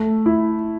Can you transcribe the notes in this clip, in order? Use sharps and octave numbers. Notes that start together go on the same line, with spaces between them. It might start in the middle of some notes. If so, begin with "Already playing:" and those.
Already playing: A3
E4